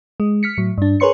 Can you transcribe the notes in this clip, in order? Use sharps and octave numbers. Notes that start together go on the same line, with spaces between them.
G#3
F6 B6 C#7
A2 F#3
G2 D4
G#4 A#4 B4 C#5 C6 C#7